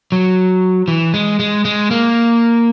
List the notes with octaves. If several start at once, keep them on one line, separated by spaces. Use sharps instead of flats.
F#3
E3
G#3
G#3
G#3
A#3